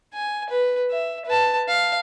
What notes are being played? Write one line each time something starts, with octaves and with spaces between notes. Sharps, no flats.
G#5
B4
E5
B4 A5
F5